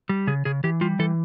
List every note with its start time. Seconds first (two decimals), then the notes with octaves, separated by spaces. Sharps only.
0.09 G3
0.27 C#3 G#4
0.45 C#3 G#4
0.64 E3 G4
0.81 G3 F4
0.99 E3 A4